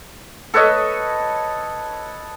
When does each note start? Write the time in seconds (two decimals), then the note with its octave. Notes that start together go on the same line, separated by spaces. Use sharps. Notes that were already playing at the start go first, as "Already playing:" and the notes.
0.54 A4 B4 C#5 D#5